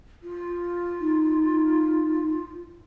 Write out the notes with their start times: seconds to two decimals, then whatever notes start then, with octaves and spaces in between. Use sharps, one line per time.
0.23 F4
1.00 D#4